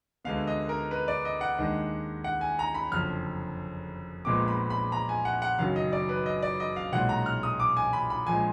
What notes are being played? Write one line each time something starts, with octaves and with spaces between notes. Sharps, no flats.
D2 D3 G#3 B3 F5
D#5
A#4
B4
D5
D#5
F#5
D#2 D#3 G#3 D4
F#5
G#5
A#5
B5
F#1 F2 D3 F6
A#1 A#2 G#3 B3 D6
B5
B5
A#5
G#5
F#5
F#5
F#1 F#2 D#3 F#3 F5
D#5
D5
B4
D#5
D5
D#5
F5
B1 A#2 G#3 F#5
A#5
F6
D#6
D6
G#5
B5
B5
A#1 A#2 F3 G#3 G#5